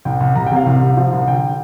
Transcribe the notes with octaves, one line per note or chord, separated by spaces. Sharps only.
C2 G5
C2
C2 A#5
G5
C3 F5
C2
C2
F3
C2
D3 G5